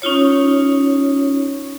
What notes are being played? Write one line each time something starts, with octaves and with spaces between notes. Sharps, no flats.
C#4 D#4 F4 C#5